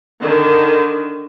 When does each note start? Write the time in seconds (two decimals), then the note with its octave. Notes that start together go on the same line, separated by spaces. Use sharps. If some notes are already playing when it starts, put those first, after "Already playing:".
0.21 D3 D#3